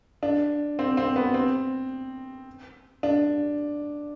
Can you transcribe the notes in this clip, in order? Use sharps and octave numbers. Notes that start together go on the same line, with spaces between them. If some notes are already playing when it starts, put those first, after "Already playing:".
D4
C4
C4
B3
C4
D4